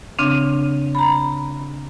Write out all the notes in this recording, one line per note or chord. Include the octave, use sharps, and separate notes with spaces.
C#3 C4 D4
A#5 B5